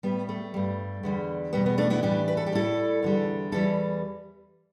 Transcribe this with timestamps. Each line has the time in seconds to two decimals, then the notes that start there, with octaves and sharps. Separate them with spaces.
0.03 A2 G3 B3
0.29 A3
0.54 G2 G3
1.03 E2 D3 G3
1.53 E2 B2 G3 B3
1.66 B3
1.78 A3 D4
1.90 B3 E4
2.03 A2 E3 G3 D4 G4
2.28 B4
2.37 A4
2.46 G4
2.52 A2 G3 E4 A4
3.03 E2 D3 G3
3.52 E2 E3 G3 E4 A4